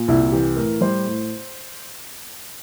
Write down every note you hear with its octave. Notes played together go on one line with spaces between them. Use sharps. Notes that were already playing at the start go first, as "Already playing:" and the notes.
Already playing: A#2
C2 E4
E3 G4
A2 A#4
G3 C5
A2